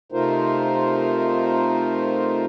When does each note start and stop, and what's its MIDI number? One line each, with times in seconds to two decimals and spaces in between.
0.12 2.46 48
0.12 2.46 57
0.12 2.46 63
0.12 2.46 65
0.12 2.46 70
0.12 2.46 72